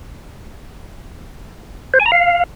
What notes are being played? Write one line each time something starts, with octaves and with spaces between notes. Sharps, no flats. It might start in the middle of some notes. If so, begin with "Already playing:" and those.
C5
G#5
A#5
F5